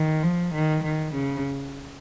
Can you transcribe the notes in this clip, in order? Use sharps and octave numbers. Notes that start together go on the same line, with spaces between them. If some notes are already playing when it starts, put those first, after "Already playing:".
Already playing: D#3
F3
D#3
D#3
C#3